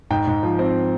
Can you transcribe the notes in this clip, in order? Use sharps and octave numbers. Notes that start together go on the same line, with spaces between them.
G#2 G5
G#2
F3
C4